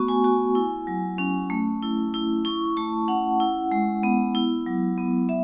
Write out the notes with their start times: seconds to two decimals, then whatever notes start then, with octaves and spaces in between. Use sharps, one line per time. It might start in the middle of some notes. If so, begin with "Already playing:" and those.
Already playing: A3 B3 F#4 C#6
0.08 G#5
0.24 F#4
0.55 E4
0.87 F#3
1.18 C#4
1.50 A3
1.83 E4
2.14 E4
2.45 E4 C#6
2.77 A3 A5
3.08 C#4 F#5
3.40 E4
3.72 G#3
4.03 B3
4.35 E4
4.66 F#3
4.98 B3
5.29 E5